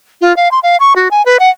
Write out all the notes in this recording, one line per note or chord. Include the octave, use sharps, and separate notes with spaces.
F4
F5
C6
F5
C#6
F#4
G#5
B4
F#5